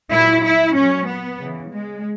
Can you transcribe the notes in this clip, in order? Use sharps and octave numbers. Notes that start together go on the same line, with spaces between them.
A#2 F#3 E4
E4
A#2 F#3 C#4
B3
C#3 E3
G#3